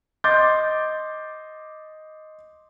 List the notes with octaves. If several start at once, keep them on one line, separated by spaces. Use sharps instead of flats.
D#5 C6 D6 G6 A6